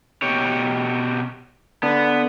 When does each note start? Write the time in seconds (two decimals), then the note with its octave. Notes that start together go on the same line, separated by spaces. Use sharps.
0.22 B2 G4 C#5
1.83 D3 B3